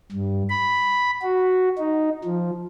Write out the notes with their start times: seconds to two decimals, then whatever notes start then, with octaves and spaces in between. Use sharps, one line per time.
0.12 G2
0.49 B5
1.22 F#4
1.78 D#4
2.24 F3